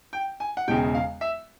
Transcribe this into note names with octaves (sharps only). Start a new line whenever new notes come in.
G5
G#5
F#5
E1 E2 C#3 G5
F5
E5